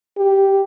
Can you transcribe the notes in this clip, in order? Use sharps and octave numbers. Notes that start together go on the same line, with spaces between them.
G4